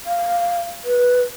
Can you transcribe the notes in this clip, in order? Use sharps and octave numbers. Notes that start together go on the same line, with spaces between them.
F5
B4